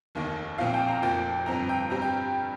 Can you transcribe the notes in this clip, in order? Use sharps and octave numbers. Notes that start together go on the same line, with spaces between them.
F1 D#2 D#3 A#3
A#1 A#2 F3 C4 F5
G5
A#5
F1 F2 F3 A#3 G5
G1 F2 F3 C4 A#5
G5
G2 G3 C4 A#5
G5